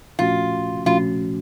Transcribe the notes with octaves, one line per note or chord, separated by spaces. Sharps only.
A#2 F3 A3 C#4 F4 F#4
A#2 F3 A3 C#4 F4 F#4